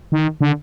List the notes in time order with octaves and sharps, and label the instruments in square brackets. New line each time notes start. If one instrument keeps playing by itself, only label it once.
[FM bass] D#3
D3